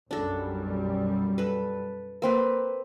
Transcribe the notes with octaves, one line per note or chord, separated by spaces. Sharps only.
B1 F#2 G3 D4 A4
A4 B4
A#3 C4 B4